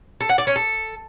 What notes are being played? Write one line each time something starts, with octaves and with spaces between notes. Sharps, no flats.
A4
F#5
D5
C#4
A4